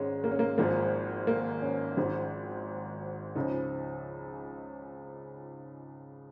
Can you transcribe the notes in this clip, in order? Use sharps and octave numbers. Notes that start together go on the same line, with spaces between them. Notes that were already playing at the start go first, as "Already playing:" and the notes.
Already playing: G#1 G#2 G#3 C#4
A#3
C#4
A#3
G#1 G#2 F3 A#3
A#3
C#4
G#1 G#2 F3
C#2 C#3 F3 D#4